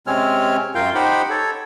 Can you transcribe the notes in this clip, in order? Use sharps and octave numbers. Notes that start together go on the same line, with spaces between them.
C3 G#3 C4 C#4 C#5 F6
F#2 F4 A#4 F5 G5 G6
D#4 G4 C5 F#5 G5 B5
A4 C#5